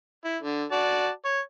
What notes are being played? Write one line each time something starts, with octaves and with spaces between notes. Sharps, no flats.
E4
D3
F#4 D5 A5
C#5